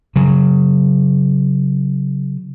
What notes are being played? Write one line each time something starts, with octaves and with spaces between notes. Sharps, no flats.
C#3 F#3